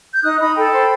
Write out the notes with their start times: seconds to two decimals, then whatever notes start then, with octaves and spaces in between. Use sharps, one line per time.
0.13 G6
0.23 D#4 D#6 F#6
0.39 D#4 B5 D#6
0.55 A4 G5 B5
0.72 C5